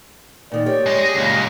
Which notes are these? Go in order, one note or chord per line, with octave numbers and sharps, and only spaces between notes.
A#2 D#3 D5
G4 C#5
G#3
G#4 A#6
C#2 A#2